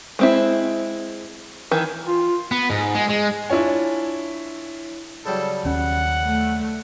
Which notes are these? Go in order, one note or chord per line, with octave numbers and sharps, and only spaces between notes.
G#3 C4 E4
D#3 E3
F4
B3
G#2
G#3
G#3
D4 E4 F4 C#5 G#5
C#3 F#3 G3 A4
D#2 C#4 F#5
A3